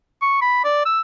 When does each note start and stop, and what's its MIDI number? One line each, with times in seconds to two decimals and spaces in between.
0.22 0.41 85
0.41 0.60 83
0.64 0.85 74
0.85 1.01 88